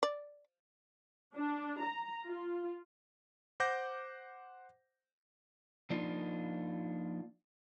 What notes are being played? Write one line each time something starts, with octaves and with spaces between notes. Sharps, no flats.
D5
D4
A#5
F4
C5 F#5 D6 G6 A#6
F3 A#3 D4 D#4 F4